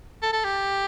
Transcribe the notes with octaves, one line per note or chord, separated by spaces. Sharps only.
A4
A4
G4